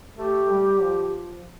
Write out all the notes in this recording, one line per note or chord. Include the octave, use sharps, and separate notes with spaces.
A3 G4
G3
F3